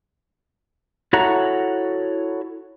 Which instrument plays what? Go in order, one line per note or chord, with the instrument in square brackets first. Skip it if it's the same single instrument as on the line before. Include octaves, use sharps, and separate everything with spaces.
[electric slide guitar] E4 F#4 A4 C#5 F#5 A#5